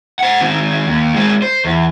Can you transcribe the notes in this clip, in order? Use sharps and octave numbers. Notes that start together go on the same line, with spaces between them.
C5 F#5
D#3 C4
D#2
G#3 C4
C5
E2